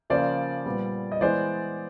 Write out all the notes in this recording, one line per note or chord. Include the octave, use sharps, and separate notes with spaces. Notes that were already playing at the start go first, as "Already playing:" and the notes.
C#3 F3 A#3 C5 D5
A#2 G3 B3
D#5
E3 G#3 B3 C5 D5